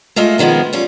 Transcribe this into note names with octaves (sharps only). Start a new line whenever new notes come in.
G#3 A3 F4 D#5 E5
B2 D#3 F3 G#3 B3
G3 C#4 F4